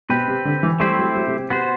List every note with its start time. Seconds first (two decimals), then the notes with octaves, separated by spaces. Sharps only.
0.09 B2 C4 G4 B4
0.28 C3
0.45 D3
0.63 E3
0.80 G3 A3 C4 E4 G4 C5
0.98 F#3
1.15 F#3
1.27 C3
1.38 C3
1.50 C3 B3 F#4 C5